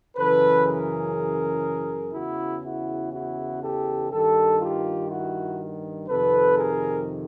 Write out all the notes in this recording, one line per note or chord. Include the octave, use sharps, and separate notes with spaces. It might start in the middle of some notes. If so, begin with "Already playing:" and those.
F#2 C#3 E3 A4 B4
G#4 A#4
E2 C#3 E3 E4 F#4
E4 F#4
E4 F#4
G4 A4
G2 D#3 G4 A4
F4 G4
E4 F#4
F2 C3 D#3 A4 B4
G#4 A#4